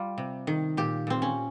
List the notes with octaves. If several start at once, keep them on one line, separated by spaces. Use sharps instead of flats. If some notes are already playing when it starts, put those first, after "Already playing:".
Already playing: G3 F4
C3
D#3
A#2 G4
A#2 C4
C#4